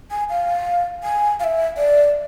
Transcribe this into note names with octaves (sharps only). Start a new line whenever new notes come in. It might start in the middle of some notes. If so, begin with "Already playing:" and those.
G#5
F5
G#5
F5
E5
D5